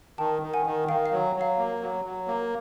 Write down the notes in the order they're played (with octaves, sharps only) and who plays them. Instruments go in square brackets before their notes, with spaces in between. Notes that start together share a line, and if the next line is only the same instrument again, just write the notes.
[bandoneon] D#3 [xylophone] G5 A5
[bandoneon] D#3
[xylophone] F#5 G#5
[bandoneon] D#3
[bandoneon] D#3 [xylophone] F5 G5
[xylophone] F5
[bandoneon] F#3
F#3
[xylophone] F5
[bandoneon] A#3
F#3
F#3
A#3